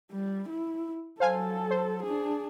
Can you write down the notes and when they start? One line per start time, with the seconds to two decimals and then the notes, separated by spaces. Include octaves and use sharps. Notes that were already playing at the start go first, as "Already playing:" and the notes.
0.12 G3
0.49 E4
1.20 F#3 A4 C5 F5 G#5
1.71 C5
2.03 D4 G#4